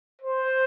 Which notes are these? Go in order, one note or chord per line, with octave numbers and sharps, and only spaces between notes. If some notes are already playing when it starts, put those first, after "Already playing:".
C5